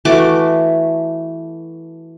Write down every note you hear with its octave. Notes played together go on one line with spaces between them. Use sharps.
E3 A3 F#4 D6